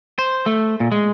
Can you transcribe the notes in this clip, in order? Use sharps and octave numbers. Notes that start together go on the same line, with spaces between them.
C5
A3
A#2
G#3